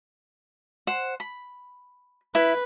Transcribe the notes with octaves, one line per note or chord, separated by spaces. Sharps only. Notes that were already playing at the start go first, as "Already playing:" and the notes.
C5 F#5
B5
E4 B4